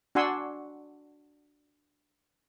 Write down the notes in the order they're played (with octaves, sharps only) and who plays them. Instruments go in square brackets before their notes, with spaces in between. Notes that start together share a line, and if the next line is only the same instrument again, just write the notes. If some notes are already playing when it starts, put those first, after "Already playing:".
[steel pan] D4 F#4 F#5 G#5 C6 E6